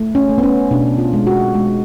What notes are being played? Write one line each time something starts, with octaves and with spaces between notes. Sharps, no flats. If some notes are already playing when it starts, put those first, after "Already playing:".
Already playing: A3
C#4
A3
B3
C#4
B2 D4
F4
G#3
F#4
G#3